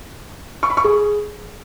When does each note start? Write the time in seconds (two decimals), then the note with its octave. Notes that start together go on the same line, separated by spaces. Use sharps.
0.63 C#6
0.70 B5
0.77 C#6
0.84 G#4